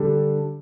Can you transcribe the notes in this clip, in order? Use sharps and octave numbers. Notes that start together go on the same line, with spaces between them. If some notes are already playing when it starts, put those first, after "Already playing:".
Already playing: D3 G3 D4 A4